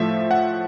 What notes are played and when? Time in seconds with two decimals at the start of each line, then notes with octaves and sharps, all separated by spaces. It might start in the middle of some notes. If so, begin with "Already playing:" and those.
Already playing: A2 F3 A3 E5
0.31 F#5